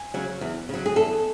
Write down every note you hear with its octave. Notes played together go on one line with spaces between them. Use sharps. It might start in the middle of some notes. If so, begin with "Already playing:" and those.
Already playing: G#5
C#3 F#3
E2
C#3 F#3
G#4
E2 A4